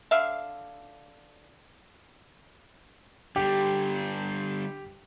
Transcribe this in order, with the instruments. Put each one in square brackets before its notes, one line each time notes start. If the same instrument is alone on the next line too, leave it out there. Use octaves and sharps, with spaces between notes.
[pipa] D3 E5 F5
[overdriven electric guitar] D3 G3 [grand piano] G4